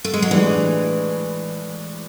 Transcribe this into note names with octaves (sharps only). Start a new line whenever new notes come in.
A3
G#3
F#3
A2 E3 G#3 D4